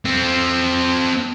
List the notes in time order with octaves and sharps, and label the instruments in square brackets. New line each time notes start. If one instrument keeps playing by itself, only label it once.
[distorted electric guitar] C4 A4